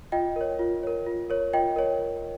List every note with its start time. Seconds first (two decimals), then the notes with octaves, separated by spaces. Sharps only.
0.12 F4 D#5 G5
0.36 A#4 C#5
0.59 F4
0.83 A#4 C#5
1.06 F4
1.30 A#4 C#5
1.53 F4 D#5 G5
1.76 A#4 C#5